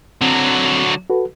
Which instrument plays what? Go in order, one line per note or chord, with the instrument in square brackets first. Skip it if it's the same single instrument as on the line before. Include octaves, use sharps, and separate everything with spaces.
[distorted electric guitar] D3 F#3 [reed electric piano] C4
[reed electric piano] F#4 A4 B4